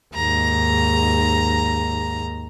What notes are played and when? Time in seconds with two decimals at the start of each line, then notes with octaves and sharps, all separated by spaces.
0.14 D#2 G#2 A#5